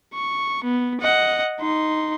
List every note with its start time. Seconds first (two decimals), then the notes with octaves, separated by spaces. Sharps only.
0.14 C#6
0.64 B3
1.01 D#5 F#5
1.60 D#4 C6